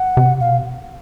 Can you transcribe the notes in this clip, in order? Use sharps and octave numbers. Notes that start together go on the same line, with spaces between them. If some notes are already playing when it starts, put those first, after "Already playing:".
Already playing: F#5
C3
B2 F5